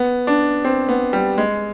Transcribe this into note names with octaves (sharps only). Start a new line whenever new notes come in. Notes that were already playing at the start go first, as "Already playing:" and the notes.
Already playing: B3
D4
C4
B3
G3
G#3